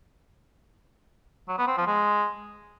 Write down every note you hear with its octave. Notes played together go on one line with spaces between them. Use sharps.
F#3
B3
C4
F3
G#3